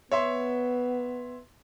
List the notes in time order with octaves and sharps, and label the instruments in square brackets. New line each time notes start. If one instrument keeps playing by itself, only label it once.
[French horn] B3 [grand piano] C#5 E5 C6